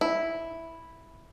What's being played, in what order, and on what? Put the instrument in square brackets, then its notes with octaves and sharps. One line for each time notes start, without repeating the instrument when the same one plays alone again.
[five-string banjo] E4